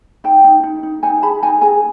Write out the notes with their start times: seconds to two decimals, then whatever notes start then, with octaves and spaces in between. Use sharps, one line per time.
0.24 D#4 G5 A5
0.44 D#4
0.63 D#4
0.83 D#4
1.03 D#4 G#5 A#5
1.22 G#4 A5 B5
1.42 D#4 G#5 A#5
1.62 G#4 G#5 A#5